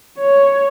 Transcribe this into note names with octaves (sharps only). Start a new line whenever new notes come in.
C#5